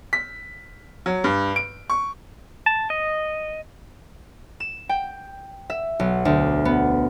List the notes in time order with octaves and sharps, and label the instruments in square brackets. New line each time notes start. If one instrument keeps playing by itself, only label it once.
[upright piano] B6
F#3
G2
D7
C#6
[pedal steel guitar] A5
D#5
[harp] E7
G5
E5
B1
D2
B3